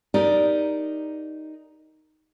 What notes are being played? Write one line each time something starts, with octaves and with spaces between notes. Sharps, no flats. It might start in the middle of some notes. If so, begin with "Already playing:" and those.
D#4 G4 A#4 D5